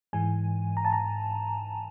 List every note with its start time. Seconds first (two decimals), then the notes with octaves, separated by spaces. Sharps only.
0.13 G#2 E3 G#3 G#5
0.77 A#5
0.85 A5
0.93 A#5